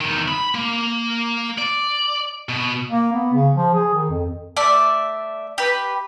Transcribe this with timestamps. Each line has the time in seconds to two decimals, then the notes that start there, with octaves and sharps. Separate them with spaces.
0.01 E2 D#3
0.28 B5
0.55 A#3
1.58 D5
2.49 B2
2.90 A#3
3.13 B3
3.34 C#3
3.55 F3
3.74 G#4
3.94 D#3
4.10 F2
4.57 A3 D5 E5
5.58 G4 B4